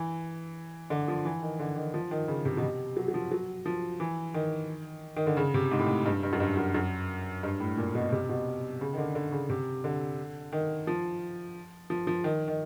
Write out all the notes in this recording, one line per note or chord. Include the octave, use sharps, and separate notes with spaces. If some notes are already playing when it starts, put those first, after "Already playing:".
Already playing: E3
D3
F3
E3
D#3
D3
D#3
F3
D#3
C#3
C3
B2
C3
F#3
F#3
F3
F#3
F3
E3
D#3
D#3
D3
C#3
C3
G#2
A2
G#2
G2
G2
F#2
G2
F#2
F#2
G2
A2
A#2
B2
C3
B2
C#3
D#3
D3
D3
C#3
C3
D3
D#3
F3
F3
F3
D#3
D#3